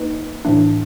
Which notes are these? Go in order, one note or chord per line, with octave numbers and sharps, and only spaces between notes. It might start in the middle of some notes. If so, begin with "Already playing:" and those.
Already playing: A#3 D#4 B4 D#5
A2 E3 A3 D4